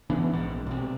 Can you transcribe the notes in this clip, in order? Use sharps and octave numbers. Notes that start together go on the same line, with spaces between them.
E3 B3 C#4 D4
A#1 G#2
B1 C3